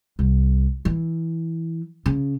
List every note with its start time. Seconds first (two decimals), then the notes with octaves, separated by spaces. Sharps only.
0.19 C2
0.85 E3
2.06 C#3